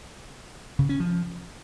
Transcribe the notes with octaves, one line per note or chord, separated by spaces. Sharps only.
C#3
C#4
F3